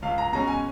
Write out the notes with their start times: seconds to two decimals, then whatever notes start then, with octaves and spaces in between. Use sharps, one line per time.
0.02 C#2 F5
0.18 A#5
0.33 B2 G#3 C#4 A#5
0.48 G#5